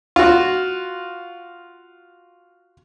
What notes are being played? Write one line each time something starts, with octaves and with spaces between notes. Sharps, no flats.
F4 F#4